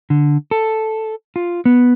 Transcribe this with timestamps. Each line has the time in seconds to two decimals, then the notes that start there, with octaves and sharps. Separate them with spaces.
0.10 D3
0.51 A4
1.36 F4
1.65 B3